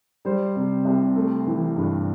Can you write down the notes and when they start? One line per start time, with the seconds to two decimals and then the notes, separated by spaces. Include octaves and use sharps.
0.25 G3 C5
0.56 C3
0.85 C2
1.16 A3
1.47 E3
1.76 G2